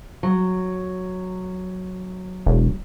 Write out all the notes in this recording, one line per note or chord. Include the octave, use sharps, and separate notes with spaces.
F#3
E1